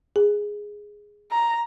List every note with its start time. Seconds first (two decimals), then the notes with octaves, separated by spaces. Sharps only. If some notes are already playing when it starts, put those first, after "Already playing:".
0.16 G#4
1.32 A#5